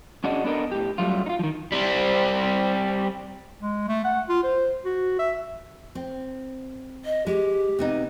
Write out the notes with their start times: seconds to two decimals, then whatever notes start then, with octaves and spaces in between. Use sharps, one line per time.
0.24 C#4 D4 F#4 G#4 D#5
0.44 B3 D4 A4 A#4 D#5
0.72 A2 G4
0.98 F#2 F#3 G3 A3 F4
1.26 D#4 F4
1.39 D#3 F3
1.72 G3 C4
3.62 G#3
3.88 A3
4.04 F#5
4.29 F4
4.43 C5
4.85 F#4
5.19 E5
5.95 C4
7.05 D#5
7.27 G#3 G4
7.79 C3 B3 D#4